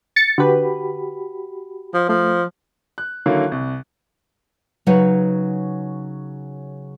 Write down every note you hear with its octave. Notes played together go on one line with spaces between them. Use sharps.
A6 C#7
D3 F#4 G4 B4 B5
F3
F3 A3
F#6
D3 D#3 F#3 A#3 E4
C2
C#3 F#3 D#4 B4 C#5